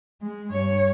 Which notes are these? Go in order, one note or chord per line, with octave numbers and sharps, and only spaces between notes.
G#3
G2 C#5